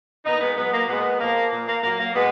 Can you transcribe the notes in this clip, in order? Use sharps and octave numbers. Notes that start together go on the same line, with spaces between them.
A#2 B3 D#4
G#3 B3
F#3 G#3 B3
A#3
A#2 G#3 B3
F3 A#3
A#2
A#3
F#3 A#3
A#3
B2 G#3 B3